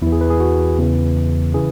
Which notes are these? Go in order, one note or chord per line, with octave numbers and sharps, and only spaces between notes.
E2 E3 E4
G#4
B4
G#4
F#4
E2 C#3 E3
C#3 E3 G#4